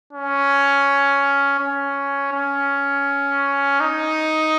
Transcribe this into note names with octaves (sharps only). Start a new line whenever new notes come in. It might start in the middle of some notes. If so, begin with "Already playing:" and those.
C#4
C#4
C#4
D#4